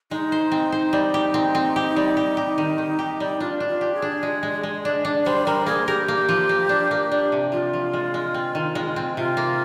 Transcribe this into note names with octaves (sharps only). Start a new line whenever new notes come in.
G#3 D#4
C5
C4
C5
G3
G4
C4
C4
G4
G3
G4
G4
D#3
D#3
G4
G3
D4 F4
D4
F4
G4
G#4
D4
G#3
G#3
G#3
D4
D4
G3 C5
G3 A#4
A#3 G#4
G4 A#4
A#3
F3
A#3
D4
A#3
D4
C3
F3 F4
F3
G#3
G#3
C4
D#3
G#3
C4
C3 F4
A#3